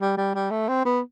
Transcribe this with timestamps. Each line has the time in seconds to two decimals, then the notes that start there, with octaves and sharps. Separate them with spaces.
0.01 G3
0.17 G3
0.34 G3
0.51 A3
0.68 C4
0.85 B3